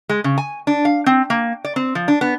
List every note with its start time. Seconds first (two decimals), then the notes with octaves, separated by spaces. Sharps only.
0.09 G#3
0.24 C#3
0.38 G#5
0.67 D4
0.85 F5
1.06 C4
1.30 A#3
1.64 D5
1.76 C4
1.95 F3
2.08 D4
2.21 B3